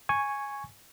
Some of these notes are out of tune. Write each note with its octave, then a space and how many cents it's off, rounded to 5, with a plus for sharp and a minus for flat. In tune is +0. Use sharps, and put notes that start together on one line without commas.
G#5 +0 C#6 +0